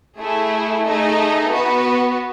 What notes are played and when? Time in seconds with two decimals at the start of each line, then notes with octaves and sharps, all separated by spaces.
0.18 A3 E4 G#4
0.85 A3 D#4 G#4 D#5
1.50 B3 F#4 B4